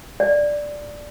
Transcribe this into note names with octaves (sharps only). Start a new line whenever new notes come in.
D5